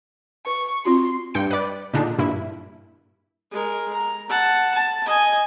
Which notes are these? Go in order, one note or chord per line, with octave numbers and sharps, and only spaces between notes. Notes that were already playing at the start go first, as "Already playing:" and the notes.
B4 C#6
C4 F4 F#4 C6
G2 G5 C#7
B4 D5
A#2 D3 G#3 D4 D#4
G2 A#2 E4
G#3 A#4
A#5
F#5 A5
A5
D#5 G#5